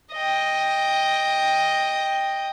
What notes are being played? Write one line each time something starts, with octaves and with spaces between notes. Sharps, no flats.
D#5 G5